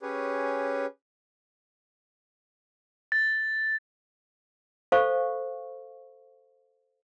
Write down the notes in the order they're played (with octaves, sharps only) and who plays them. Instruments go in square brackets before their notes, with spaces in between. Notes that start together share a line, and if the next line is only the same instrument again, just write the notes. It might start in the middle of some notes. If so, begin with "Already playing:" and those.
[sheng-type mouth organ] C#4 G4 G#4 B4 C#5
[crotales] A6
[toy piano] A4 C5 F5 C#6